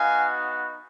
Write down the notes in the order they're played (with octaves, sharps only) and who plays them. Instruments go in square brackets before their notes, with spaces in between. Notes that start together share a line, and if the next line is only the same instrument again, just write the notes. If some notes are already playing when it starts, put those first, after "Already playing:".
Already playing: [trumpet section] B3 D#4 F#4 F5 G#5